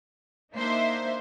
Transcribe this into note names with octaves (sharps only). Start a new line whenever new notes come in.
A#3 D4 D#4 C5 E5